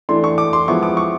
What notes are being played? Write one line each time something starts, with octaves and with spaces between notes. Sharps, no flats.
E3 A3 D4 C6
C#6
D6
C6
F3 G#3 B3 E4 C#6
D6
C#6